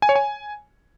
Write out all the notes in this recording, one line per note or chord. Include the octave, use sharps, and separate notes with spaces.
G#5
C#5
G#5